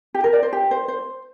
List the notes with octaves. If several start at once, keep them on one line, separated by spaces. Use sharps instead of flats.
G4
A#4
D5
C5
G4
C5
C5